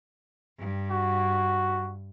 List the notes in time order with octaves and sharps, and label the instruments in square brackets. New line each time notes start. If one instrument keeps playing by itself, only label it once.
[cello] G2
[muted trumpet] F#4